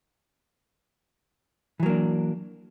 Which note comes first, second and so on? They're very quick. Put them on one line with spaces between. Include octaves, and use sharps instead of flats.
E3 F#3 A#3 D4